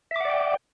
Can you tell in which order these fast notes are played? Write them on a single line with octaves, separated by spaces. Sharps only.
E5 D6 F#5 D5 G5